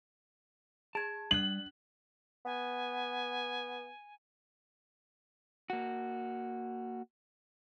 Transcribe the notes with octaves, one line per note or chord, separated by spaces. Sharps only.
G#4 A5 G#6
G3 D4 F#6 F#7
B3 G#5
A#3 F#4